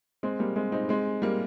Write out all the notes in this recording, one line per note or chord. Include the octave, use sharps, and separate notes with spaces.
G#3 C4
G3 A#3
G#3 C4
C4 D#4
G#3 C4
G3 A#3